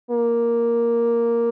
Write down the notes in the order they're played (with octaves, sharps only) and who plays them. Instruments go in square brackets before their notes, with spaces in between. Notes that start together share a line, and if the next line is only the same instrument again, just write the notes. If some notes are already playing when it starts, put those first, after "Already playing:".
[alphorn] A#3